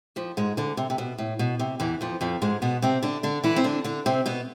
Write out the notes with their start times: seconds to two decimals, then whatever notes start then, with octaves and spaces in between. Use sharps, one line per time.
0.16 F2 F3
0.37 G#2 G#3
0.57 D2 D3
0.77 C3
0.90 C3
0.98 B2
1.18 A2
1.39 B2
1.59 C3
1.80 E2 E3
2.01 F2 F3
2.21 F2 F3
2.42 G#2 G#3
2.62 B2 B3
2.82 C3 C4
3.03 D3 D4
3.23 D3 D4
3.44 E3 E4
3.56 C4
3.64 D3 D4
3.84 D3 D4
4.06 C3 C4
4.26 B2 B3